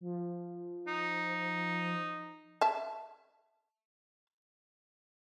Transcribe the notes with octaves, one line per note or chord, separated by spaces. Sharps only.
F3
D#4
E5 A5